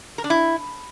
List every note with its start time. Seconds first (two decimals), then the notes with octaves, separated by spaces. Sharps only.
0.18 A#4
0.24 D4
0.30 E4